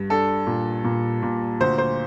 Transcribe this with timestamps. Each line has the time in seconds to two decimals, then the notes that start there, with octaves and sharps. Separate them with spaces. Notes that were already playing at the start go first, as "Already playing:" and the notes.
Already playing: G2
0.10 D4 A4
0.47 A#2
0.84 A#2
1.22 A#2
1.60 D2 C5
1.78 C5